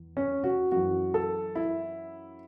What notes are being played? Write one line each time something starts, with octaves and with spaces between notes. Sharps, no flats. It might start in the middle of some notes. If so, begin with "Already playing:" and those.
Already playing: E2
C#4
F#4
F#2 E3 F#4
A4
E4